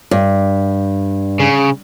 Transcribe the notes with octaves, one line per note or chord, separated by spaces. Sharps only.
G2
C#3